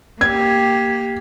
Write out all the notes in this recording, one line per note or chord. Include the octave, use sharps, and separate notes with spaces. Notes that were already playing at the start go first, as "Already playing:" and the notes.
A#3 G4 G#6